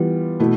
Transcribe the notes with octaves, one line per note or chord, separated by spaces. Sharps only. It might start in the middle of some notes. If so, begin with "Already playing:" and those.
Already playing: E3 G3 B3 F4
B2 A3 E4